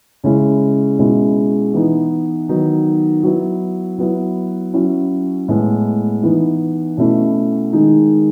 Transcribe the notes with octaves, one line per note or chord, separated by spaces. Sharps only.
C#3 G#3 C#4 E4
B2 G#3 C#4 E4
E3 B3 D#4
D#3 F#3 B3 D#4
F#3 B3 E4
F#3 B3 E4
F#3 C#4 E4
A2 G#3 B3
E3 B3 D#4
B2 A3 C#4 E4
D#3 G#3 D#4